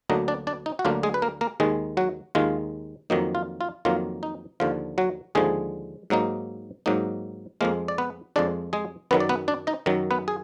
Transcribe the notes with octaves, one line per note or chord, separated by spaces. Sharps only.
D2 D3 F#3 A#3 D4 D#4 D#5
D4 D5
D4 D5
D#4
F#4
D2 D3 F#3 A#3 D4 F4
G#3 G#4
B4
A#3 A#4
A#3 A#4
D#2 D#3 G#3 G#4
F#3 F#4
D#2 D#3 G#3 F4
F2 D#3 F#3 A#3 D#4
F4
F4
F2 D#3 F#3 A#3 F4
D#4
D#2 D3 F3 F4
F#3 F#4
D#2 D3 F3 G#3 G#4
G#2 F#3 A#3 D#4
G#2 F#3 A#3 D#4
F2 F3 G#3 A#3 A#4
D5
B3 B4
F2 F3 G#3 D4 D5
G#3 G#4
F#2 D#3 F#3 B3 B4
D5
B3 B4
D4 D5
D#4 D#5
F#2 D#3 F#3
B3 B4
G#4